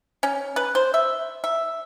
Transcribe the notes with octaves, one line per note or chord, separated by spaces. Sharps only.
C#4
B4
C5
E5
E5